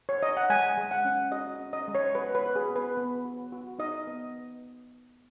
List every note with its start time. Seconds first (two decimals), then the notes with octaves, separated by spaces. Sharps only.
0.09 C#5
0.23 D#5
0.37 F#5
0.50 G#3 G#5
0.78 G#3
0.91 F#5
1.05 C#4
1.32 F#4 D#5
1.60 C#4
1.73 D#5
1.88 G#3
1.95 C#5
2.15 F#4 B4
2.35 B4
2.42 F#4
2.56 G#4
2.70 B3
2.76 B4
2.97 B3
3.25 F#4
3.52 F#4
3.79 D#4 D#5
4.07 B3